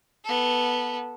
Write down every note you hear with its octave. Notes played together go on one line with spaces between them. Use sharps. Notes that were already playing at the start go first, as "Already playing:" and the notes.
B3 A4